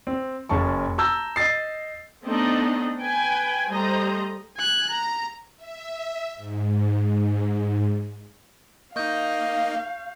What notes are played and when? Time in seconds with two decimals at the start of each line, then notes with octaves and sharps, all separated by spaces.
0.07 C4
0.49 F#1 C#4 A5 C#6
0.98 A5 A#5 E6 G6
1.36 D#5 E6 A6 C7
2.24 A3 B3 C4 D4 D#4 D#5
2.98 B4 G5 G#5
3.69 G3 A3 C5 D#5 A#5
4.57 G#5 F#6
4.90 A#5
5.56 E5
6.36 G#2
8.96 A#3 D#4 D#5 F5 C#6 G6